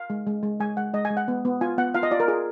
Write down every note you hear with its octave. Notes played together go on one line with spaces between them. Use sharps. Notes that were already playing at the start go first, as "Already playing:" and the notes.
Already playing: F5
G#3
G#3
G#3
G#3 G#5
G#3 F#5
G#3 D#5
G#5
G#3
F#5
B3
B3
F4 G#5
B3 F#5
F4 F5
D#5
F4 D5
A#4
F4 G#4